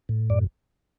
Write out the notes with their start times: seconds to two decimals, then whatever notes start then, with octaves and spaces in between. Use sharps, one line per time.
0.09 A2
0.30 F#2 D5